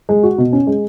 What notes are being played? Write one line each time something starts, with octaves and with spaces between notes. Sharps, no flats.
G#3
F#4
B2
C#4
G#3